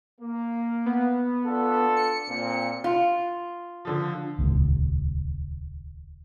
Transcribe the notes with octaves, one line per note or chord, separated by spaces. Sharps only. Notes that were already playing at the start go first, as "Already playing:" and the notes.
A#3
B3
D4 F4 A4
C#7
A#2 C4
F4
D3 F3
D#1 C#2